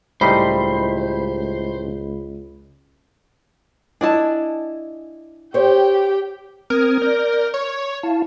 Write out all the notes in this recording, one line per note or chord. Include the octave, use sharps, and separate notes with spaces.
C#2 A2 G3 D#4 C5 B5 B6
D4 E4 D#5 G#5 A5
G4 C5 C#5 G5
C4 A#4 D#6 G#6
D5 G6 A#6
C#5 C#6
E4 F5 A5